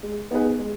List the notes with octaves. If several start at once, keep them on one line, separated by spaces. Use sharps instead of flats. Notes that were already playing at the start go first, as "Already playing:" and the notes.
G#3
B3 D#4 G#4 B4
G#3